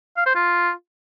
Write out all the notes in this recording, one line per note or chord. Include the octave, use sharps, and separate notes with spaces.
F5
C5
F4